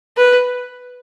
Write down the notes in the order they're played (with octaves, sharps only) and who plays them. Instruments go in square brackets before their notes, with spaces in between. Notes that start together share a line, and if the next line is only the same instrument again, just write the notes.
[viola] B4